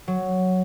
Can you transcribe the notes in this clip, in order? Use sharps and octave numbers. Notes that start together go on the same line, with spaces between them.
F#3